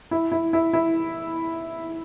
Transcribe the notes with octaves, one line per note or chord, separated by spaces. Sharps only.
E4
E4
E4
E4